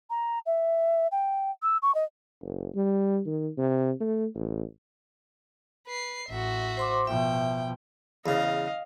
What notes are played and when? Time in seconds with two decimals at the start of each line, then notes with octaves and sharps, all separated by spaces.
0.10 A#5
0.46 E5
1.12 G5
1.63 E6
1.82 C#6
1.95 D#5
2.41 F#1
2.75 G3
3.26 D#3
3.57 C3
4.00 A3
4.34 A1
5.87 B4 C7
6.29 A1 F#4 E5
6.77 C5 C6 D6
7.07 B2 F3 E5 G5
8.26 E2 C#3 D#5 F5